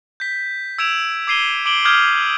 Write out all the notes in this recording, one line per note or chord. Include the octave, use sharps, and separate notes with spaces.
G6 B6
E6 G#6 D7 E7 F7
D6 G#6 C7 D#7 G7
D6 D7 F#7 G7
D6 D#6 F6 G6 G#6 G7